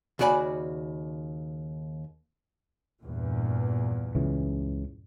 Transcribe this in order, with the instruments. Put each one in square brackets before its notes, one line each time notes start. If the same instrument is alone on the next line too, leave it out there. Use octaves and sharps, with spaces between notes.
[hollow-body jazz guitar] D#2 C#3 F#4 D5 G#5 B5
[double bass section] E2 G2 A#2
[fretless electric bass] C#2 C#3 E3